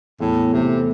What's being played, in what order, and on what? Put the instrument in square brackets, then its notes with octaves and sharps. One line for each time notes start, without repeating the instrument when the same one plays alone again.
[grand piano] E2 [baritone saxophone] A2
[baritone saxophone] C3 [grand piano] E3 A3